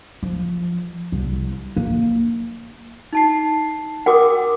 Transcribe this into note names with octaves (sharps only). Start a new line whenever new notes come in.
F3
C2
A#3
D#4 A5 C7
F#4 A#4 F#5 G5 D6 D#6